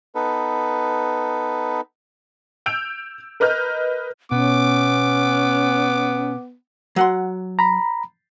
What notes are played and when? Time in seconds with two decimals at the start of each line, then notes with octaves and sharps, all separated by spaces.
0.15 B3 D#4 A4 B4
2.66 E6 G6 D7 F7
3.40 A#4 B4 D#5 F6 G6
4.32 B2 B3 C#4 D6
6.96 F#3 F#5 C6
7.59 A#5 B5